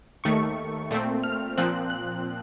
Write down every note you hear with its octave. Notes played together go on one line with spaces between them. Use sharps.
D#2 D#3 A3 C#6
A#2 A3 C4
F6
A#2 F3 C4 F#6
F#6